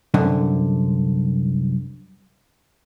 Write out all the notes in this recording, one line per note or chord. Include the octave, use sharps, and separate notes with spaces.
C2 F#2 D3